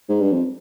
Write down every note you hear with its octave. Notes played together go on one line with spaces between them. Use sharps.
G#2
G2
F2